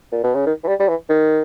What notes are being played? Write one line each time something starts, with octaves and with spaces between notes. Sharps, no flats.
A#2
B2
C#3
D#3
E3
G3
G3
E3
D#3